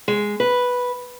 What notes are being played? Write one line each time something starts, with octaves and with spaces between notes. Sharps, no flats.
G#3
B4